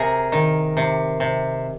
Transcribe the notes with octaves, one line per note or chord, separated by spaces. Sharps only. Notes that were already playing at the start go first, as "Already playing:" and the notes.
Already playing: C3 G#4 A#4
D#3
C3
C3